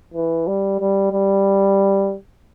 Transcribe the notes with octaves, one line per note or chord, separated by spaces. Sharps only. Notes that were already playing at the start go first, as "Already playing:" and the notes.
E3
G3
G3
G3